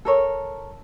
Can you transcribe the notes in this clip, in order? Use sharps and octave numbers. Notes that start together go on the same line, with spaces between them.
A4 A#4 C#5